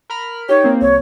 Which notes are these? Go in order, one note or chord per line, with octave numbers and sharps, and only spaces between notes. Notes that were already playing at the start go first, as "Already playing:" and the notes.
A#4 B5 F6
D#4 G4 C#5
A#3 C4
C2 C#5